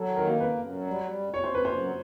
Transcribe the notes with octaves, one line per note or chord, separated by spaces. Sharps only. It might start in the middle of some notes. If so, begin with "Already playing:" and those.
Already playing: F#3 A4
D#3
A#4
A#3
F#2 B4
F#2
F#3
G3
G3
F#2
F#2 C#5
C5
F#2
B4
F#2 C5
F#3